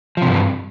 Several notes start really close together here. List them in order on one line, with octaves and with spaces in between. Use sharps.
F3 C3 G2